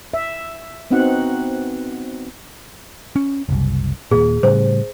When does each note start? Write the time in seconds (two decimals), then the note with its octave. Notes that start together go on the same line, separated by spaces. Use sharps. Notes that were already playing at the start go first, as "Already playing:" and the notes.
0.14 E5
0.91 B3 C4 D#4 F#4 F#5
3.16 C#4
3.49 F#1 C2
4.11 D#1 G#1 A#2 G#4
4.43 A2 C#3 G3 C5